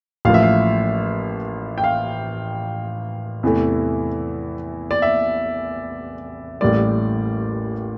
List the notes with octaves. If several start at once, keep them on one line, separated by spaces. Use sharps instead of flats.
A1 A2 F3 A#3 F5
E5
F5
G5
F5
E2 C3 E3 A3
D5
E5
A1 A2 G3 A#3 D5